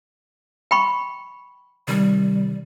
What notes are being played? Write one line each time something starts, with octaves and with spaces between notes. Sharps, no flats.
G5 B5 C#6
C3 D#3 G3